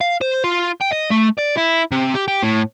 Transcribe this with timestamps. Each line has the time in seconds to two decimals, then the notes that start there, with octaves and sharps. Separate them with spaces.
0.01 F5
0.21 C5
0.44 F4
0.81 G5
0.93 D#5
1.11 A3
1.39 D5
1.58 E4
1.92 C3
2.15 G4
2.28 G4
2.43 A2